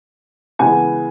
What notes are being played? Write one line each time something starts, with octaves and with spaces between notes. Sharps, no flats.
C#3 E3 G#3 B3 G#5